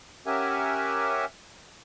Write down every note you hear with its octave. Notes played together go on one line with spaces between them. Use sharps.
C#4 G4 A#4 E5 F#5 G#5